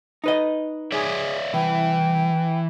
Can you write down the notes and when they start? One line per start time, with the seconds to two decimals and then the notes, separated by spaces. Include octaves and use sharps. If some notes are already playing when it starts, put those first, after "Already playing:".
0.24 D#4 B4 D#5
0.92 G#4 C#5 D5 E5
1.54 C2 E3 G5